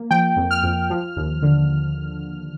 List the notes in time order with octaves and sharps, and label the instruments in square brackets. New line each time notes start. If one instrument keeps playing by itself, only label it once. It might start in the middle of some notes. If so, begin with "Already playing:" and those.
Already playing: [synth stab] A#3
F3 G5
F2
F6
F2
F3
D#2
D3